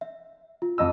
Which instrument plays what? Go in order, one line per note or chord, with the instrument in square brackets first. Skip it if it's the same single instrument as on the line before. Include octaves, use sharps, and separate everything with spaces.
[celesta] E5
F4
[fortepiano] F2 D#5 E6